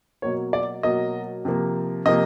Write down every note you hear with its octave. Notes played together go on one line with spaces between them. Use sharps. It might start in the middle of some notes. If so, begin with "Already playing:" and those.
B2 F#3 A#3 C#5
D5
B2 F#3 A#3 D#5
C3 F3 A#3
C3 F3 A#3 D#5